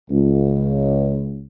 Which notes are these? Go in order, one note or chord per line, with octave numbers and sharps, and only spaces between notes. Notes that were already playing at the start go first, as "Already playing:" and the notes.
C#2